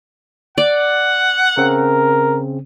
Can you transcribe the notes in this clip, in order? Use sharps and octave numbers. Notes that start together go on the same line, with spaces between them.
D5 F#5
C#3 C4 A#4